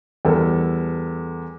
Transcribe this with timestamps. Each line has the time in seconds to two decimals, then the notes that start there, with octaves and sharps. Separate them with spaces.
0.25 E2 G3 A4 A#4